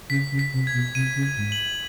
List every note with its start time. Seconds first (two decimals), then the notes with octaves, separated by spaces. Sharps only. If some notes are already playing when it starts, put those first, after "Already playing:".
0.10 C#3 B6
0.32 C#3
0.39 B6
0.53 C3
0.67 G#6
0.73 B2
0.95 C3 D#7
1.16 C#3
1.23 G#6
1.37 G#2
1.52 F#7